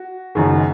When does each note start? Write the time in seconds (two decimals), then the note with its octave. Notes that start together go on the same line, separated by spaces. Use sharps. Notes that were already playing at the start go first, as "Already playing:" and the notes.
Already playing: F#4
0.35 F#1 F#2 D#3